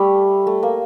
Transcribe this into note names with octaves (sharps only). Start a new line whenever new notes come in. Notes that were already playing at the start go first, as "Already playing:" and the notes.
Already playing: G3 A3
A3
A#3